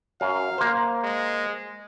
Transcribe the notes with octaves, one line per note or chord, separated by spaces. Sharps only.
F#2 F5
A#3 C5
G#3